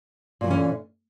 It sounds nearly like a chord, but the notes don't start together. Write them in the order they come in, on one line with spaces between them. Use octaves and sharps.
A#2 F#3 E3 C#4 D3